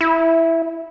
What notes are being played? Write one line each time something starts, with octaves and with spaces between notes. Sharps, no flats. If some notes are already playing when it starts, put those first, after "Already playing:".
E4